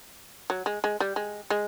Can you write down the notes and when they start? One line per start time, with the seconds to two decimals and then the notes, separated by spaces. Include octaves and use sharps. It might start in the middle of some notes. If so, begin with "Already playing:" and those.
0.50 F#3
0.66 G#3
0.84 G#3
1.00 G3
1.16 G#3
1.50 G#3